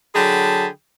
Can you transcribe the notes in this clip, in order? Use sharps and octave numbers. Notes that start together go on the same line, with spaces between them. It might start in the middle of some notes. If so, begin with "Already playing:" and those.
D3 F#3 G#4 G5 A5 B5